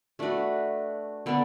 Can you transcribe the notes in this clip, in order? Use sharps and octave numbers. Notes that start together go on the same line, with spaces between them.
A3 D4 F#4 B4
D3 B3 D4